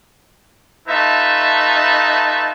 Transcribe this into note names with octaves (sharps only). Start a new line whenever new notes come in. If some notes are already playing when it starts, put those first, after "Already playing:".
A3 D#4 F4 B4 E5 A5